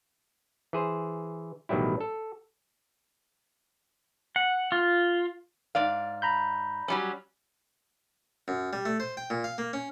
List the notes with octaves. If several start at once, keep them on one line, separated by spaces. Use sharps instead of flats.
E3 G#4 C5
A1 B2 D#3 F#3 G3 E4
A4
F#5
F4
G#2 D5 F5
A#5 B5 G6
F#3 G3 C#4
F#2
G3
A3
C5
G5
A#2
F5
A#3
C#4